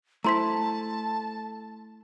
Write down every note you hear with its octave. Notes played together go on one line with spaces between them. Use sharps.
A3 E4 C5 A5 A#5 C6 B6